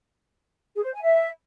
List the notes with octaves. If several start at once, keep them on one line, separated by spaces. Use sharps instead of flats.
G#4
C5
G#5
E5